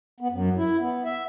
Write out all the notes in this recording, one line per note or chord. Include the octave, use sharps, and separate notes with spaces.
B3
F#2
E4
B3
E5